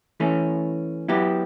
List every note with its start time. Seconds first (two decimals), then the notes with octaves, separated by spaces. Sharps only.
0.20 E3 A3 C#4
1.08 F#3 B3 E4 G4